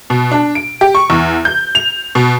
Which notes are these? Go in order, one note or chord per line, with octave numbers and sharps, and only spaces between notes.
B2
D4
D7
G4
C#6
E2
G6
F7
B2